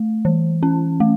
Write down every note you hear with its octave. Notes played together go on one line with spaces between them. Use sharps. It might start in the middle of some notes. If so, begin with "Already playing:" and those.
Already playing: A3
E3
C#4
A3